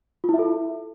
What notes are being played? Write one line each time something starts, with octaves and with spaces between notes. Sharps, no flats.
F4
E4
E5
A4